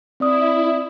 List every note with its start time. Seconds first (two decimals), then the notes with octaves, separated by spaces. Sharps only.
0.20 C4 E4 D5 D#6